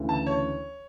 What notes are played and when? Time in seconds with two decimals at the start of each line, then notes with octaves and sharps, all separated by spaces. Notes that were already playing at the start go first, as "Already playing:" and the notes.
Already playing: D2 C#3 E3
0.09 A5
0.26 C#5